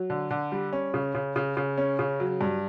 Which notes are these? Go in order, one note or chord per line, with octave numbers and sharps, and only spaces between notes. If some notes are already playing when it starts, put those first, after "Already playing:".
Already playing: F#3
D3
D3
G3
C#4
C#3
C#3
C#3
C#3
C#4
C#3
F#3
G2